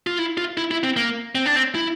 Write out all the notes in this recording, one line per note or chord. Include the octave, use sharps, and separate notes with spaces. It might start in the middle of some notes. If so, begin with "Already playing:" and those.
F4
E4
F4
E4
E4
C4
A#3
C4
D4
C4
E4